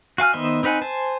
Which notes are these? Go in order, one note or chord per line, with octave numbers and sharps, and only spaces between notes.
F#4 F5 G#5 F6
D#3 B3 C5 D#5 E5
C4 D#4 B4 F#5 G#5
C5 G#5 A5